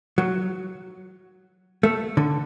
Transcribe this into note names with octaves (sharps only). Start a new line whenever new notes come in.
F#3
A3
D3